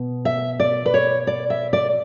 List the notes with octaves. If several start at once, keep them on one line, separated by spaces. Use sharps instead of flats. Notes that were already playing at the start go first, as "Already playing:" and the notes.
Already playing: B2
E5
D5
B4
C#5
D5
E5
D5